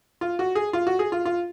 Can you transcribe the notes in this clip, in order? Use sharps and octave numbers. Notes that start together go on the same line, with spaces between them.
F4
F#4
G#4
F4
F#4
G#4
F4
F4